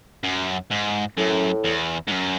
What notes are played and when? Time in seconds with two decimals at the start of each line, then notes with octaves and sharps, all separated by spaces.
0.24 F#2
0.70 G#2
1.17 F#2 A2
1.64 E2
2.07 G#2
2.11 F#2